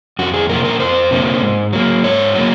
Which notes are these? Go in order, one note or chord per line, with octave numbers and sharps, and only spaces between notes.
F2 F#4
G#4
C3 F3 A#3 A#4
A#4
F2 C5
C3 F3 A#3
G#2
F#3 A#3
G#2 C#5
F#3 A#3